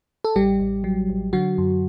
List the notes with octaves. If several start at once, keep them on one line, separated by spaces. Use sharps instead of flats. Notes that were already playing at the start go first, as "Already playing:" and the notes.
A4
A1 G3 G4
A1
F#3
A1
D3 F#3 F#4
F#2